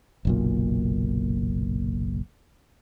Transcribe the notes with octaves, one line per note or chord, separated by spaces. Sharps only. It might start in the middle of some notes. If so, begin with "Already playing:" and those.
F#1 B1 A#2